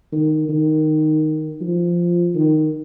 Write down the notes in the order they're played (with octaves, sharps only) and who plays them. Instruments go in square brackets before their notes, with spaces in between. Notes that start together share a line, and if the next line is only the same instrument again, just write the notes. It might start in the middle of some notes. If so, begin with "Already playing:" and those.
[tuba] D#3
D#3
F3
D#3